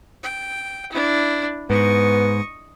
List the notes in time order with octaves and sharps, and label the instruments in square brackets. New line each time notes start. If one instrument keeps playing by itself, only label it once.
[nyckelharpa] G5
D4 E4
[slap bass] G#2 [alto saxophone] B3 [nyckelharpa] D#5 C#6